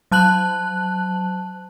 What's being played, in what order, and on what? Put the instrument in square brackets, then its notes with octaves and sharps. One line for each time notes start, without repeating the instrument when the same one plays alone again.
[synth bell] F#3 A5 F#6 F#7